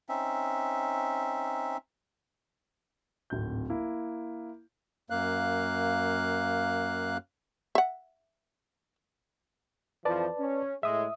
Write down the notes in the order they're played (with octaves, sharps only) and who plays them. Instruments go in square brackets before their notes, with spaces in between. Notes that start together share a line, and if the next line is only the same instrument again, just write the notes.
[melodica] C4 C#4 D#4 E5
[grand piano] D1 G#1 G6
A#3 E4
[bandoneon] F#2 A#3 F5 F#6
[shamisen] E5 F#5
[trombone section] F2 E3 F3 [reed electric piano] B4 D5 A5
[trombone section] C#4
[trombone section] A2 G#3 [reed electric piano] E5 D#6